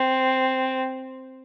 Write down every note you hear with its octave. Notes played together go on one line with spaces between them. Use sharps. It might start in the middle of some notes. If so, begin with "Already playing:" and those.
Already playing: C4